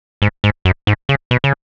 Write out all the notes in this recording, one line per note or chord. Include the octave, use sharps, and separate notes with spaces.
G#2
G#2
F#2
G#2
C#3
B2
C#3